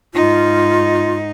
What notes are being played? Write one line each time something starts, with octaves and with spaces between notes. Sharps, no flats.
G#2 D#4 F4